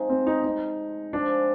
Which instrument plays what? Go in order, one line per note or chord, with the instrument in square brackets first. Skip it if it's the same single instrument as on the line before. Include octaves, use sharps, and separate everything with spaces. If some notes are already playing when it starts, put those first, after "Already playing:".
Already playing: [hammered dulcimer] C3 F3 G#3 [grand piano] D#4
[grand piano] C4
D#4
D#4
[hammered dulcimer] F3 G#3 C4 G4 [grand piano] D4